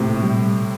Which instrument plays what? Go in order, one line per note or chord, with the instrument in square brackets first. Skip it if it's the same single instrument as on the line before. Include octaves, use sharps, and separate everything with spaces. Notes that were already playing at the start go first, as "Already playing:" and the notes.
Already playing: [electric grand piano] A2 C3
[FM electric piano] A#2
G3